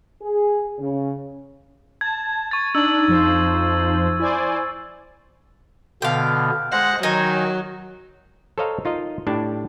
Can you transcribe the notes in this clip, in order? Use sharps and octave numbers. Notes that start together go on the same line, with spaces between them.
G#4
C#3
A5 G#6
C#6 G#6 A6
D4 D#4 E6 G#6 F#7
F2 F3 C5
E4 C5 D5 G#5
B2 D3 B3 F5 G5
G#3 C5 F#5 A#6
D#3 F#3 D#4 G#5
A4 C5 C#5 D#5 F5 A#5
D#4 F4 A#4 D#5
A2 D4 G4 A5